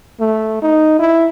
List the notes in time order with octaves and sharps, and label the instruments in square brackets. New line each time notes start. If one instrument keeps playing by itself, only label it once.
[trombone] A3
D#4
E4